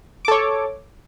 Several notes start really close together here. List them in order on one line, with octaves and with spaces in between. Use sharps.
D6 A4 C#5